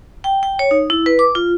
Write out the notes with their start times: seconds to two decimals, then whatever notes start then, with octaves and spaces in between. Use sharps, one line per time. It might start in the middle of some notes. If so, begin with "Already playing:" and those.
0.24 G5
0.43 G5
0.59 C#5
0.71 D#4
0.90 E4
1.06 B4
1.19 D6
1.35 F4